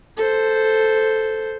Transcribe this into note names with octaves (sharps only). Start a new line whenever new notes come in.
A4 C5